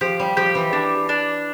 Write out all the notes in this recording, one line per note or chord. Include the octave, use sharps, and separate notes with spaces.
F3 G4
G3
F3 G4
E3
D4
D4